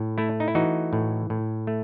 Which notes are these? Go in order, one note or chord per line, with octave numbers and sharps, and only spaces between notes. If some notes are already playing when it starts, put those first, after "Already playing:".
Already playing: A2
A3 E4
D#4
E4
E3 D#4 F#4
A2
A2
A3